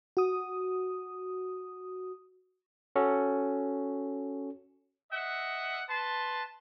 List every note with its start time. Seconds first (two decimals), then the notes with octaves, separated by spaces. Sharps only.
0.17 F#4 D#6
2.96 C#4 F#4 A4
5.12 D#5 E5 F#5
5.89 B4 A5 C6